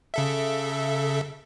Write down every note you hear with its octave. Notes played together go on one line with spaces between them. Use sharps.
C#3 A4 E5